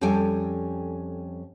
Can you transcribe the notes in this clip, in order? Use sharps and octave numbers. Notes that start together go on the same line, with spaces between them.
F2 G3 C#4 A4 G5 G#5